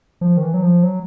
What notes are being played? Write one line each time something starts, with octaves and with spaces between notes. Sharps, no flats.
F3
D#3
E3
F#3
F3
F#3